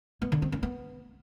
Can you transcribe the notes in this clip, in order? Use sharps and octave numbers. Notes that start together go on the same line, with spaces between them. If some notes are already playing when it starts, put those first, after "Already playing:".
B3
D3
C4
C#4
B3